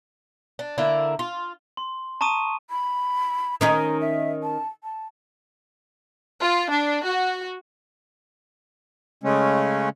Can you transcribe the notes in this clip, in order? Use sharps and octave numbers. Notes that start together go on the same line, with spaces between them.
D4
D3 A#3 E4
F4
C6
A5 A#5 C#6 D#6 D#7
B5
D#3 C#4 D#4 A#5
E5
A5
A5
F4
D4
F#4
C#3 G#3 A3 C#4